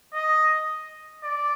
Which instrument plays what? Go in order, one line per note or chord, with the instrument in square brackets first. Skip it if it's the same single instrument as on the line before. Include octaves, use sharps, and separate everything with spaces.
[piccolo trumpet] D#5
D5